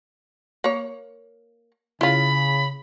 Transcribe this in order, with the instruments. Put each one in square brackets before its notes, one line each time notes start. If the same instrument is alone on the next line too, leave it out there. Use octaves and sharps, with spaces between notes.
[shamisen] A#3 C#5
[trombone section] C#3 [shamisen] E4 F4 [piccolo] B5